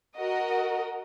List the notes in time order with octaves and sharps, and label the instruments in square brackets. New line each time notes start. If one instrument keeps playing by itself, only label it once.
[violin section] F#4 A#4 D#5